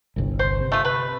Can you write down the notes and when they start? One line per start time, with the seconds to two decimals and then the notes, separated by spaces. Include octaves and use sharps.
0.16 G1 C2
0.39 C5
0.60 C3
0.72 A3 F4
0.85 B4